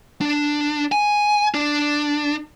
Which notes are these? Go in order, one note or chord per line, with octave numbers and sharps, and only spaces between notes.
D4
G#5
D4